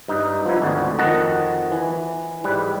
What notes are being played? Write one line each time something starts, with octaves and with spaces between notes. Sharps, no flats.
G2 D#4
F3 B3 E4
G#1 D2 D3
F2 D#3 F#4 D#5 F#5 A5
E3
G#2 G3 B4